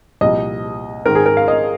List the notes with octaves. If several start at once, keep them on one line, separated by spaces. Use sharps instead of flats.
C2 A#2 F3 D#5
G#2 D#3 A#4
G#4
A#4
F5
D#5